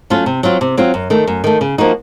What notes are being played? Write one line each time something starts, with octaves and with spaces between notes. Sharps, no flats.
F#3 A3 C#4 F4
C3
F#3 C4 F4
C3
F#3 C4 F4
F#2
D#3 A3
F#2
D#3 A3
C#3
F3 A#3 D#4 F#4